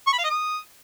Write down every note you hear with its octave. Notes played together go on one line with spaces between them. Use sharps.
C#6
B5
F5
D#5
D#6